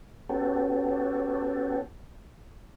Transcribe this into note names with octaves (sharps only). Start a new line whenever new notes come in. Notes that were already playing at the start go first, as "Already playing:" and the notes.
B3 C#4 F#4 G4 A4